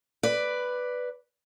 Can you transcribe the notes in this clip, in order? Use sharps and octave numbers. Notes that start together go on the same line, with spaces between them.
B4 D5